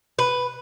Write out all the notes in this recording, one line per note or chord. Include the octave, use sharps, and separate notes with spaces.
B4